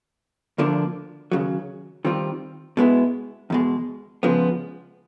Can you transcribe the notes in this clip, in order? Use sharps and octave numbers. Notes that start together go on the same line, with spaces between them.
D2 D3 F3 A#3 D4
D#2 C#3 F#3
D#3 G3 C4 F4
B2 G#3 B3 E4
E2 B2 G#3
C#3 F3 G#3 B3